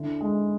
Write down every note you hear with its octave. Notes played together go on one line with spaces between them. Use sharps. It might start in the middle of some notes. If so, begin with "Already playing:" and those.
Already playing: D3 E4
G#3